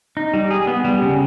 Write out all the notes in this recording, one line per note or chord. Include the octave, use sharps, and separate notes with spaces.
D#4
G3
G#4
B3
G3
C#3